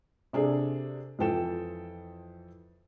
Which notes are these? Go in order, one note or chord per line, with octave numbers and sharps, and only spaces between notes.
C3 D4 G#4 A4
F2 E3 F3 A4 G5 E7